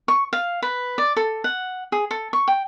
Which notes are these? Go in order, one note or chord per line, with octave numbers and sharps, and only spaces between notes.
C#6
F5
B4
D5
A4
F#5
G#4
A4
C#6
G5